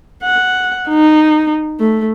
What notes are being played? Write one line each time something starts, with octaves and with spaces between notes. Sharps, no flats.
F#5
D#4
A3